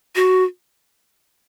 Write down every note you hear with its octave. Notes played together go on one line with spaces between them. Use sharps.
F#4